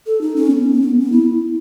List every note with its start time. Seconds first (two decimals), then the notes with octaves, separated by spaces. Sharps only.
0.07 A4
0.21 D#4
0.36 C#4
0.50 B3
0.73 C#4
0.81 B3
1.00 B3
1.12 E4